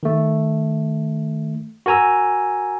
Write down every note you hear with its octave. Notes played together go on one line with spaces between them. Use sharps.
D#3 A3
F#4 A#4 G#5 A#5 E6